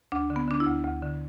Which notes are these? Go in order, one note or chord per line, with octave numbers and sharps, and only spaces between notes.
D2 D4
D3
B3
D3 D4
E4
D2
D2
D3